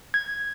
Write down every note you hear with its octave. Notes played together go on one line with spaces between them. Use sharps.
G#6